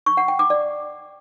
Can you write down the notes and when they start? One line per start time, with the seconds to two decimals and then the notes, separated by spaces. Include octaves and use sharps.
0.06 C#6
0.17 F#5
0.28 G5
0.39 D6
0.50 D5